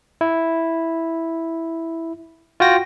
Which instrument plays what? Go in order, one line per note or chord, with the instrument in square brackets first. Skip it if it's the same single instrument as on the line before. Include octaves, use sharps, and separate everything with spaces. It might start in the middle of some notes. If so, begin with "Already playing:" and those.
[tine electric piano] E4
F4 F#4 G5 A#6